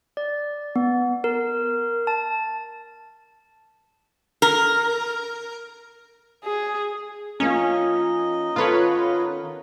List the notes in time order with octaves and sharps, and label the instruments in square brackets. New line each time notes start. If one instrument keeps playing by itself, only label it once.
[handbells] D5
B3
A#4
A5
[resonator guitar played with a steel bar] A#4
[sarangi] G#4
[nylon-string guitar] F3 A#3 F4 [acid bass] C#4 [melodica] D#4 D#5
[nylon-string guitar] D#3 B3 A4 [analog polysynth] F4 B4 C#5